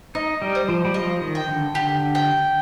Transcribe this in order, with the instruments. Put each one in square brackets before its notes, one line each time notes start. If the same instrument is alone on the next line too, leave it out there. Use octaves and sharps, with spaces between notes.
[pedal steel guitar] D#4 [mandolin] D#5
[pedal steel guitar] G3
[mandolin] C5
[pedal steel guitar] F3
G3
[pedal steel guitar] F3 [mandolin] D#5
[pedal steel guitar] D#3
[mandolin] G5
[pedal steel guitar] D3
[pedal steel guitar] D3 [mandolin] G4
[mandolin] G5